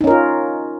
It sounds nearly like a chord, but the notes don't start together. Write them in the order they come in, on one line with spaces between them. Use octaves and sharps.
D#4 C#4 A#4 F4